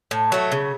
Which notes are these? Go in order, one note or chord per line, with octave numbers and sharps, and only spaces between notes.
A2
F#3 A3
C#3